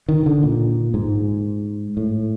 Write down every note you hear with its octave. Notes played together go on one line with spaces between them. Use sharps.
D#3
D3
A#2
G#2
A2